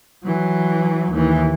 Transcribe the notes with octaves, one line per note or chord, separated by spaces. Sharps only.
E3 F#3
D#2 E3